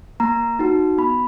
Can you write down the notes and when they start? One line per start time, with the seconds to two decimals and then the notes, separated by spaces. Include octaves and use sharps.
0.20 A#3 A#5
0.59 D#4 F#4
0.98 B3 B5